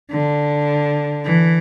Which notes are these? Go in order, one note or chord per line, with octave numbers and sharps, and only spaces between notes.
D3
E3